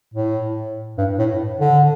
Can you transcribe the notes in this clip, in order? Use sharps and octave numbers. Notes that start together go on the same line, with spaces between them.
A2
G2
A2
D3